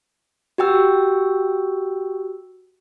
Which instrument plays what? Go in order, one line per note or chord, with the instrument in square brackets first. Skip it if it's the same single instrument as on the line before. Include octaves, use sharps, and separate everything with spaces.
[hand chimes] F#4 G4 G5 E6